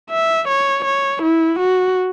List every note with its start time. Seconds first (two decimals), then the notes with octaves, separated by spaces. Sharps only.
0.10 E5
0.48 C#5
0.85 C#5
1.22 E4
1.60 F#4